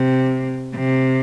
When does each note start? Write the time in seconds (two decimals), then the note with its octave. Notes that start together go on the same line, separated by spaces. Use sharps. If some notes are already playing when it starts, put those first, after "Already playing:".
Already playing: C3
0.75 C3